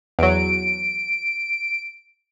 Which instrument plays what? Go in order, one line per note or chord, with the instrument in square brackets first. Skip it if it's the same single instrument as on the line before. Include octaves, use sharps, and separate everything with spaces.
[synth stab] E2 F#3 [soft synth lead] D7